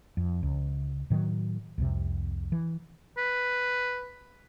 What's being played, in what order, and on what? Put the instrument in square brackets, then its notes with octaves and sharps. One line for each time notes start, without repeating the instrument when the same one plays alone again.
[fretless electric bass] F2
C#2
A2 D#3 F3 F#3
C2 F2 C3
E3
[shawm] B4